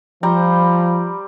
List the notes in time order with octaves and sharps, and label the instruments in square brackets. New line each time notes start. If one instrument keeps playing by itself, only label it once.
[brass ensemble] F3 [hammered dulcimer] G3 C5 A#5